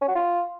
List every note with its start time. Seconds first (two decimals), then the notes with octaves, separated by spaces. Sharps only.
0.01 C#4
0.08 F#4
0.16 F4